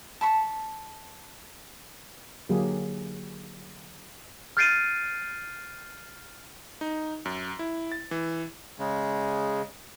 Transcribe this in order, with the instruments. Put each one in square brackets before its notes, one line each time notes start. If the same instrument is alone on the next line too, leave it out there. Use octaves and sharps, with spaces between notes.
[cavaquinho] A5 B5 C#6
[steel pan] D3 F#3 A#3 G4 G#4
[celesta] F6 G6 A6 C7 D7 D#7
[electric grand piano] D#4
F#2
E4
A6
E3
[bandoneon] C#3 G#3